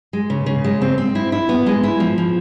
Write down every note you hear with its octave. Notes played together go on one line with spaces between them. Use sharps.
G#3
C#3
C#3
G#3
C4
C4
E4
E4
B3
G#3
E4
F3
F3